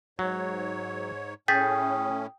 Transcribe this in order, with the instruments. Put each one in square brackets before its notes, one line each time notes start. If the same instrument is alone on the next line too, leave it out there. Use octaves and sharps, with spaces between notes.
[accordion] G#2 C#5 [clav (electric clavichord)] F#3
[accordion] A2 C#4 [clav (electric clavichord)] G#4 [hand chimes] G5 D#6 [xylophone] G6 A6 B6